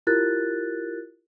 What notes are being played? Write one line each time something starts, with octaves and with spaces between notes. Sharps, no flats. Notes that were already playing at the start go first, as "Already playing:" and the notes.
E4 F4 G4 A#4 F#6 A6